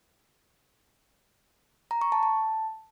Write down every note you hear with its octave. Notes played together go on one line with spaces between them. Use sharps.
A#5
C#6
A5
A5